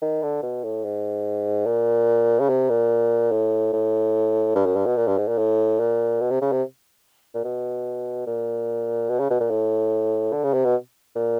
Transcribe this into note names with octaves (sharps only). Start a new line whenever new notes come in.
D#3
D3
B2
A2
G#2
A#2
C#3
C3
A#2
A2
A2
G2
F#2
G2
B2
A#2
G2
G#2
A#2
A2
A#2
B2
C3
C#3
C3
A#2
B2
A#2
B2
C#3
B2
A#2
A2
D3
C#3
C3
B2
A#2